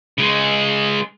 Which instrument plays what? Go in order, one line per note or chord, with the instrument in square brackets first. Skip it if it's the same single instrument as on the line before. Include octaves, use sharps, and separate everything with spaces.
[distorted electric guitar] C#3 G#3